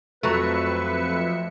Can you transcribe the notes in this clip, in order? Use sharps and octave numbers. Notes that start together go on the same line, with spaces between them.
F2 F#3 A3 B4 E5 C#7